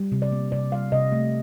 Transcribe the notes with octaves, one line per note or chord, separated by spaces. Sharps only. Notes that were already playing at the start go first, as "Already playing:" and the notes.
Already playing: G3
C3
D5
A#3
C3 D5
G3 F5
C3 D#5
A3